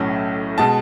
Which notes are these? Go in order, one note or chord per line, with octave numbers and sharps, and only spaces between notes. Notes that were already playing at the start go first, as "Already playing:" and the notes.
Already playing: B1 A2 F#3 A3 C#4
B2 G#3 A5